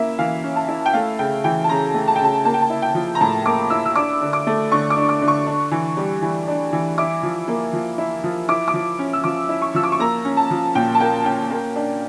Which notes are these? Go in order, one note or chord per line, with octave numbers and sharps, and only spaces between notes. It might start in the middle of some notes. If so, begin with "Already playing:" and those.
Already playing: A#3 C#4 E4 E5
E3 F5
C#4
A5
E4
G5
A3 F5
C#3 G5
E3 G5
A5
C#3 A#5
A3
A5
G5
C#3 A5
A#3 A5
G5
A5
E4
G5
F3
A#5
A2 A5
A#3 D6
E4 E6
E6
D4 D6
D3
D6
A3
D3 C#6
D6
D4
D6
D3
C#6
D4
E3
G3
E3
D4
E3
E4 D6
F3
A#3
F3
E4
F3
E4 D6
D6
F3
C#4
E6
F3 D6
E4
C#6
F3 E6
D6
C#6
A#3 A#5
C#4
A5
F3
A#2 G5
A5
A#3 G5
C#4 G5
A#3
D4